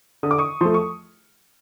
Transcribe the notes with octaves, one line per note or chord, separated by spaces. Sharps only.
D3 D#6
D6
C#6 D#6
F3 A3 C6
C#6